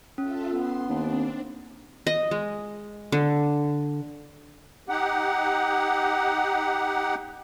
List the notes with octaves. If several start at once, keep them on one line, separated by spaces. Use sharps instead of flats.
C#4 F4 A4 E5
B3 C6
D#2 C4 D4
D#5
G#3
D3
D#4 G4 F#5